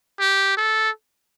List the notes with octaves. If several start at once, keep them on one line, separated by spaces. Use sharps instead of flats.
G4
A4